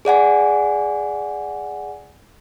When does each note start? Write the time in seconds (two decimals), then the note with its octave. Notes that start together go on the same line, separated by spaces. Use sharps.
0.05 G#4 D5 F#5 G#5